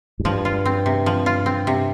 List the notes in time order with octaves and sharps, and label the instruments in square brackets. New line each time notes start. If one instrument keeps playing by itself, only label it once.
[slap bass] G#2
[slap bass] G2 [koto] F3
[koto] F4
C4
C3
F3
F4
C4
C3